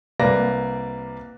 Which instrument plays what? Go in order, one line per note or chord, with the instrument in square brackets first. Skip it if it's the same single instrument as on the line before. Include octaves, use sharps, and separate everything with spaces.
[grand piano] C2 A#3 B4 D5 A#6